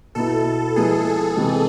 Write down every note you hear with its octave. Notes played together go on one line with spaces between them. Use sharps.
B2 B3 E4 A4
F3 G#3 B3 E4 G#4
G#4
C3 E3 G#3 C4